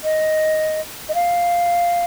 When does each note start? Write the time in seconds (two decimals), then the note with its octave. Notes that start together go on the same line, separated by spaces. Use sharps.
0.04 D#5
1.09 D#5
1.15 F5